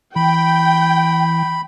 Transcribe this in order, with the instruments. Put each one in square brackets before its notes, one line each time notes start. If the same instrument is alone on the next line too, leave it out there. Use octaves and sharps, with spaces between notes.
[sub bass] E3 [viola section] G5 [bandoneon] B5